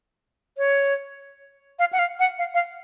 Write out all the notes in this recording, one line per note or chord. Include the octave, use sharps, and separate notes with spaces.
C#5
F5
F#5
F5
F#5
F5
F5